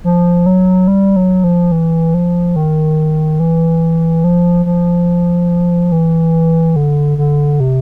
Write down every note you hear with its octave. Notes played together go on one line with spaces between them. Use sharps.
F3
F#3
G3
F#3
F3
E3
F3
D#3
E3
F3
F3
E3
D3
D3
C3